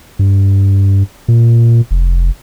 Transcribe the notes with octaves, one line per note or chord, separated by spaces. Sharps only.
G2
A#2
F1